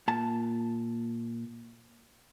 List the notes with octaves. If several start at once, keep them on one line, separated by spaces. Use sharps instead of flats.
A#2 A5